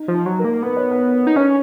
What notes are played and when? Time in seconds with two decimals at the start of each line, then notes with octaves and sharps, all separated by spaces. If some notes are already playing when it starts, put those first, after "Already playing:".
Already playing: D#4
0.08 F3
0.13 D#4
0.26 F#3
0.38 A#4
0.44 A#3
0.62 B3 B4
0.76 C#5
0.91 B4
1.27 D#4
1.36 C#4 C#5